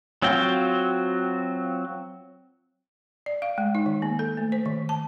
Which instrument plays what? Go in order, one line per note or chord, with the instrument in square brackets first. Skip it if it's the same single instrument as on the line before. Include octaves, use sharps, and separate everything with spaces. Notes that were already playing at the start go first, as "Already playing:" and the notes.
[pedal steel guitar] F#3 C4 F4 F#4 G5
[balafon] D5
F5
G#3
D#4
D#3
A#3
A4
A3
C5
D#3
A5